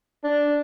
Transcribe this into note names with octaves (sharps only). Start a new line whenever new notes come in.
D4